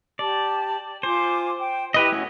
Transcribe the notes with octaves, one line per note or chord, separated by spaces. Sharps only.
G4 D5 A5
F4 C5 G#5 D6
G5
E4 G4 B4 D#5
A3 C#4 F#4